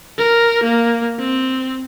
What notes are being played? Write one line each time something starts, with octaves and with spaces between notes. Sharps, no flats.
A#4
A#3
C4